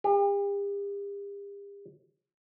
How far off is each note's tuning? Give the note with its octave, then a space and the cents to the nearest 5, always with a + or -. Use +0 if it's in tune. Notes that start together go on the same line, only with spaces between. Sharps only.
G4 +40